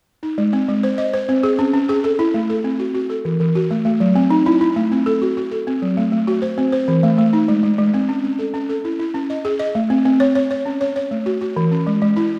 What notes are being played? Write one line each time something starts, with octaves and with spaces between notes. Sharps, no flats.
D#4
G#3
C4
G#3
C5
D#5
C5
C4
G#4
C#4
C#4
G#4
A4
E4
A3
A4
C4
F#4
F#4
A4
E3
E3
F#4
A3
A3
F#3
C4
D#4
E4
E4
A3
C4
A4
F#4
F#4
A4
C4
F#3
A3
A3
F#4
C5
C4
C5
E3
A3
A3
D#4
G#3
G#3
G#3
C4
C#4
C#4
A4
C#4
A4
E4
E4
C#4
D#5
G#4
D#5
A3
C4
C4
C#5
C#5
C#5
C#4
C#5
C#5
A3
F#4
F#4
E3
C#4
G#3
G#3
E4